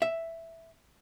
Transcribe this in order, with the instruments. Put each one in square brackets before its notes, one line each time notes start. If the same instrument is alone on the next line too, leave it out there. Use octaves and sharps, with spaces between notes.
[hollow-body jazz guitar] E5